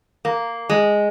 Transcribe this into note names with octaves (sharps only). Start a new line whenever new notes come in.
A#3
G#3